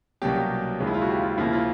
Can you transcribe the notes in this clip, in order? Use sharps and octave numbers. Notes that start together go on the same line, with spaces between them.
C2 B2 F#3 A#3 C#4 G4
G4
D#2 C#3 F3 G#3
E4
F4
F#4
G4
F4
D#2 C#3 F3 A#3 E4
F4